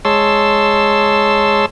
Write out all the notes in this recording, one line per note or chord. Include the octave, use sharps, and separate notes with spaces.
G#3 C#5 A5 C6 E6